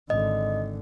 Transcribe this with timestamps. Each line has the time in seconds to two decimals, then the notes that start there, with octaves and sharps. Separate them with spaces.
0.10 G#1 D3 D#5